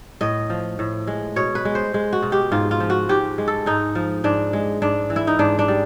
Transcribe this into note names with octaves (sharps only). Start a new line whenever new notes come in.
A2 D#5
F3
A2
G#3
B2 C#5
B4
G#3
C5
G#3
F#4
B2
G4
G#2 F4
F4
F3
F#4
G#2 G4
G#3
A4
G#2 D#4
F3
G#2 D4
G#3
G#2 D4
E3
E4
D#4
G#2 D4
D4
G3